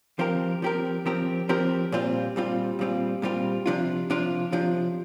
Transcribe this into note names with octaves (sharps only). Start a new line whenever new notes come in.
F3 C4 G4 A#4
F3 C4 G4 A#4
F3 C4 G4 A#4
F3 C4 G4 A#4
A#2 G3 C4 F4
A#2 G3 C4 F4
A#2 G3 C4 F4
A#2 G3 C4 F4
C3 F3 D4 F4
C3 F3 D4 F4
C3 F3 D4 F4